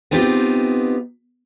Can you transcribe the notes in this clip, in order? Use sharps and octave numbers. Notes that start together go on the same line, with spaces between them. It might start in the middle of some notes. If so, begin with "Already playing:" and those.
B3 C4 D#4 F4 G4